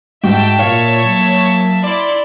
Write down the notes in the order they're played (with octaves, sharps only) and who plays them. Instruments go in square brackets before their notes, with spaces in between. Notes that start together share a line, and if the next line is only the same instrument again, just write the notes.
[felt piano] G#2 F#4 [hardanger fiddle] E5 A5 [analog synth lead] G5
[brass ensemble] A#2 [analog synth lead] C#5 [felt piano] F5
[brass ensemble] F#3 A#3
[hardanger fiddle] E4 C6 [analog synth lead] D5